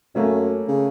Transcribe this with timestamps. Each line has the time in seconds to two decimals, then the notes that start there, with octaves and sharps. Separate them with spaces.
0.15 F#2 A3 A#3 C#4
0.68 C#3